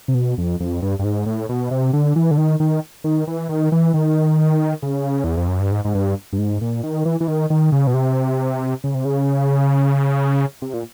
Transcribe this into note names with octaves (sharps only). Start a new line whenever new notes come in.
C3
B2
F2
F2
G2
G2
G#2
A2
B2
C3
D3
E3
D3
D#3
D#3
D#3
E3
D#3
E3
D#3
C#3
E2
F2
F#2
G2
G#2
G#2
G2
G2
G#2
A#2
D#3
E3
E3
D#3
D#3
C#3
B2
C3
C#3
C3
C#3
C3
A#2